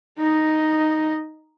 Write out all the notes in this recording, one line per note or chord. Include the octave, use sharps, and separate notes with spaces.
D#4 D#5